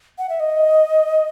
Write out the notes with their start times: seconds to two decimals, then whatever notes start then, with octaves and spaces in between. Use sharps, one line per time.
0.18 F#5
0.29 E5
0.40 D#5